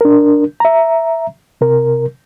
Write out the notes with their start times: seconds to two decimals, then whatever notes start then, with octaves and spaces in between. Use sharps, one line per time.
0.01 D4 A#4
0.60 E5 A#5
1.61 C3 A#4